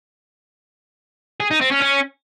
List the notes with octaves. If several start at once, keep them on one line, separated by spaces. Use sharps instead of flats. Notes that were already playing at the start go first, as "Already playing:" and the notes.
G#4
D#4
C4
C#4
C#4